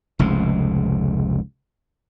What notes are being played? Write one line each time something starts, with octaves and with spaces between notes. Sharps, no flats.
F1 C#2 G#2